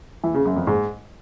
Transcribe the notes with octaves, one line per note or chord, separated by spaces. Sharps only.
E3
C#3
F#2
F2
G#2